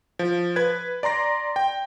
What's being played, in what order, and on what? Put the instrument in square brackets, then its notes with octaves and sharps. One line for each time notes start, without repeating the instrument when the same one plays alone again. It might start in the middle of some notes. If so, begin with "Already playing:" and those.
[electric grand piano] F3
B4 G#6
D5 A#5 C6 A#6
G5